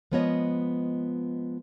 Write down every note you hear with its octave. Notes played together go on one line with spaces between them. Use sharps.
F3 G#3 B3 F4 C#5 D#5